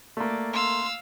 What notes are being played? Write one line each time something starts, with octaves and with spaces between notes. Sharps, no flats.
A3 A#3 D5
F5 C6 E6